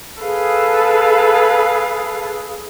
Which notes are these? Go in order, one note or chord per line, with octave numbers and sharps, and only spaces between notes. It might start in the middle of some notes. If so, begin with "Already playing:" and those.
G#4 A4 B4 F5